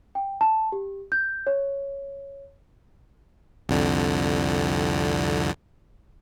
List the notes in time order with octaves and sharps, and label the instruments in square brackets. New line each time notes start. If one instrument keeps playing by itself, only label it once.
[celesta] G5
A5
G4
G6
C#5
[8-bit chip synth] C2 F2 D3